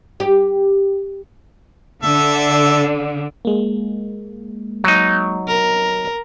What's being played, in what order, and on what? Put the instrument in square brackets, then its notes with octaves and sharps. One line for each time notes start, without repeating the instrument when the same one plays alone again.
[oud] G4
[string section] D3 [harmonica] A4 E5
[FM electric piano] G#3 A#3
[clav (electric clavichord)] F#3 D#4
[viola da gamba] A#4